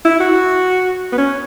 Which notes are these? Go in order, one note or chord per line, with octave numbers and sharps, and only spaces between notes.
E4
F#4
B3
C#4